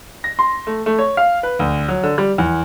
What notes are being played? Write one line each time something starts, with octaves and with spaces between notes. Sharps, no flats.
A#6
C6
A3
A3
C#5
F5
B4
D2
F#3
D3
G3
E2